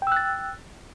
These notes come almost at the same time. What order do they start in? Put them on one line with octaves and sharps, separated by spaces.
G5 E6 F#6 A6